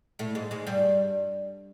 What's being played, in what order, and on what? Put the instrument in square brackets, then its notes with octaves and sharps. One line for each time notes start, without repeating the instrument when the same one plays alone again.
[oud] A2 A3
G#2 G#3
G#2 G#3
G2 G3